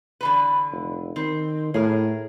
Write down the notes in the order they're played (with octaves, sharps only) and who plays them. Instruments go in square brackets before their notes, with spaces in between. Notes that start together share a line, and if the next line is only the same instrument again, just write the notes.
[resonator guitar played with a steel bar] D3 E3 B4
[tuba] F1
[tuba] D#3 [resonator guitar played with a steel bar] C4
[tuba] A2 [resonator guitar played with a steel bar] G#4 A#4